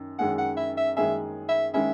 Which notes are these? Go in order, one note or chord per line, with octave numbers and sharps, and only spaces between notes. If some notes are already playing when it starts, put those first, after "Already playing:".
Already playing: F#2 D#3
F#2 D#3 G#3 C#4 G#4 F#5
F#5
E5
E5
F#2 D#3 G#3 C#4 G#4 E5
E5
D#3 G#3 C#4 G#4 E5